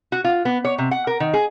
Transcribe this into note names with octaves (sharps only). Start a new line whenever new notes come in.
F#4
F4
B3
C#5
C3
F#5
A#4
D#3
G#4